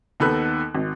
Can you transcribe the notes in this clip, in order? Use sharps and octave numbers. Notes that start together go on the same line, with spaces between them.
D#2 B3 D#4 A4 B4 F#6
G#1